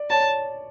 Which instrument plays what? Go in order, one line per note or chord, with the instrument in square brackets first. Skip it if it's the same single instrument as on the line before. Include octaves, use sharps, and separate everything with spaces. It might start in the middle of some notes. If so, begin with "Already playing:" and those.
Already playing: [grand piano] D5
[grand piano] C#5 [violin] A5